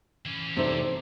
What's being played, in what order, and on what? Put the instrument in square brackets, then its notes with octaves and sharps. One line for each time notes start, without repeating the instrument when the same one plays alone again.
[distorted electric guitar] E3 C#4
[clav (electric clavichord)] C3 A3 D5 [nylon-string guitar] C4 D#4 C5